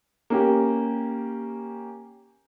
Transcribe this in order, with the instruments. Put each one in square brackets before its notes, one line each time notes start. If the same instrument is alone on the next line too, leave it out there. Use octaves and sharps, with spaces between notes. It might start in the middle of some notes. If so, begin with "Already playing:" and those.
[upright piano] A#3 C#4 G4